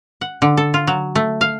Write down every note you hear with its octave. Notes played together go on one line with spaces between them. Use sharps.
F#5
D3
A4
F4
F#3
A3
F5